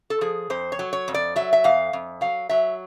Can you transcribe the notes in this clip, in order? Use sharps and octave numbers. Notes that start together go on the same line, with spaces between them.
A4
F3 G#4
F2 C5
C#5
F#3
C#5
F2
D5
F#3 E5
E5
F2 F5
F2
F#3 F5
F#3 E5